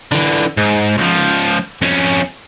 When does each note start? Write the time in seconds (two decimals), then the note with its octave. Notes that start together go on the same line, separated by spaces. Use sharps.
0.12 D3 E3
0.57 G#2
0.98 C#2 F3
1.82 F2 C#4